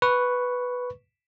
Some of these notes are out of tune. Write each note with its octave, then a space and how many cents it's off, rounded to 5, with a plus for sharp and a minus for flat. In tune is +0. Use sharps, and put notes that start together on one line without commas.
B4 +0 C#6 +0